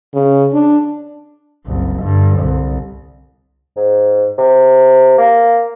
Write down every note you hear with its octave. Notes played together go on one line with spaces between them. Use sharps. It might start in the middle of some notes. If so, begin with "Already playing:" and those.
C#3
D4
F#1 C2
G2 D3
C2
G#2
C3
A#3